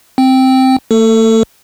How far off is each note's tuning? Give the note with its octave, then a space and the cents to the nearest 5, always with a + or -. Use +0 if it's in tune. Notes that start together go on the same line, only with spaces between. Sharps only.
C4 +0 G5 +0
A3 +45 A4 +20